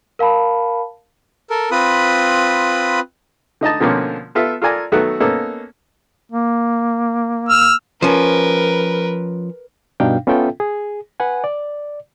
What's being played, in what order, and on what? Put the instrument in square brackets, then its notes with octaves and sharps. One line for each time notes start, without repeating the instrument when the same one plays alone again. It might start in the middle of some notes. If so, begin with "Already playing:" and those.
[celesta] A#4 F5 A5 B5
[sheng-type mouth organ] A4 A#4
C4 F4 B4 B5 D#6
[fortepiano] D3 D#4 D#5 A5
B2 D3 F3 A#3 C4 C#4
B3 F4 A4 E5
F4 A4 A#4 D5 G#5 A#5
D#3 F#3 A3 B3 F#4 A4
A#3 B3 C#4 D#4 A4
[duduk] A#3
[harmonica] E6 F6
[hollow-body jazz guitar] F3 C#4 [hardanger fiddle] A#4 B4
[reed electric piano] G2 B2 D4 D#4 F5 G5
B3 C#4 F4 A4 E5 G5
G#4
B4 F#5 G#5
D5